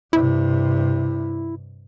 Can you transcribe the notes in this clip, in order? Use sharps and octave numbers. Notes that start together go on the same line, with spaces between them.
G2 C3 E4